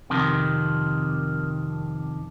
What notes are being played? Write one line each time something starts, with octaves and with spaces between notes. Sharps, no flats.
F2 C3 D#3